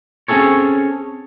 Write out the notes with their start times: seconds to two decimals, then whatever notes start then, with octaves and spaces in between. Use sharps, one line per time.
0.28 C4 C#4 F4 G#4 A4 C#5